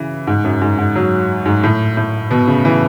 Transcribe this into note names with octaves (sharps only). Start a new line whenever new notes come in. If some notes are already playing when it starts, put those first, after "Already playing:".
Already playing: C#3 E3
G#2
F#2
G#2
G#2
F#3
G#2
A2
A2
B2
C#3
E3